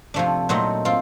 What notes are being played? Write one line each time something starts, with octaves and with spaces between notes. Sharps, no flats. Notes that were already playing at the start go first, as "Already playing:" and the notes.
C3 F3 A3 D4
A#2 F#3 A3 C4 D#4
C4 F4